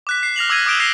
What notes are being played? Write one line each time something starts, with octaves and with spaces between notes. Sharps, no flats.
D6 F#6 B6
C7
F6 A#6 F7 F#7
D6 E6 F6 G#6 A#6 D#7
D6 D#6 G6 D7 E7 G7
F#6 A#6 C7 D#7 G7